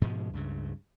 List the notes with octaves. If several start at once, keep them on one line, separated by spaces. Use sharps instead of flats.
G#2 B2 F3 G#3
C#2 G2 C#3